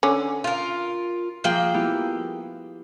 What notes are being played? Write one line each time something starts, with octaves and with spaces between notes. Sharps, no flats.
D3 C#4
F4 A#4
F3 A#3 G#4 G5
B3 E4 G4